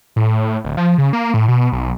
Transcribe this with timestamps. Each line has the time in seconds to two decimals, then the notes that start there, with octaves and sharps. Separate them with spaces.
0.16 A2
0.64 D1
0.77 F3
0.98 C#3
1.13 A#3
1.34 A2
1.48 B2
1.72 B1